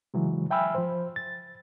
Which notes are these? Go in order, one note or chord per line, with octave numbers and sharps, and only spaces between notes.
C#3 E3 F#3 G#3
E5 G5 G#5 B5 E6 F6
F3 C5
A6